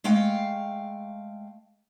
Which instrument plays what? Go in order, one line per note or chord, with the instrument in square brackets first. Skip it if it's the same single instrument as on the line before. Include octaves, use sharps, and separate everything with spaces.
[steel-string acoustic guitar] G#3 A3 F5 G5